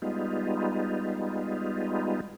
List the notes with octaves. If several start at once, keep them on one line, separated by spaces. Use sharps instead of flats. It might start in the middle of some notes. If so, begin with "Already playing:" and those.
G3 G#3 B3 D#4 F4